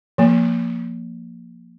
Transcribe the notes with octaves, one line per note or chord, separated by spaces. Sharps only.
F3 A#3